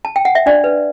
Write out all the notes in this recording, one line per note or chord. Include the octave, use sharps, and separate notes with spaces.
A5
G5
F#5
E5
D4 D5
B4